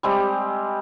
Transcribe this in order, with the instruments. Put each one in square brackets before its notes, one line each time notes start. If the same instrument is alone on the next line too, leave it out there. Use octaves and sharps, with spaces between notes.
[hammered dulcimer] G3 G#3 C4 G4